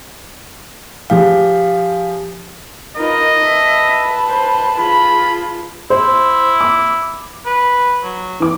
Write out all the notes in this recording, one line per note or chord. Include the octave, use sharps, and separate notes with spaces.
F3 G4 G#4 F5
D#4 F4 A#4 B4 D#5
B4 E5 A5
C5
F4 G#4 B5
E4 C5
D6
B4
F#3
E3 D6